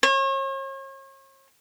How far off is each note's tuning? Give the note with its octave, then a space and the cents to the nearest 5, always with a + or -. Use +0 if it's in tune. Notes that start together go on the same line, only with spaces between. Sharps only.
C#5 -40